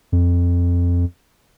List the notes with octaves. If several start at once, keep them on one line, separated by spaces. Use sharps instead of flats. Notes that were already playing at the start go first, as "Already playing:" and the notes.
F2